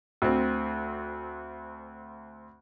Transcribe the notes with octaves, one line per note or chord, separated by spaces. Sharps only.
D2 C4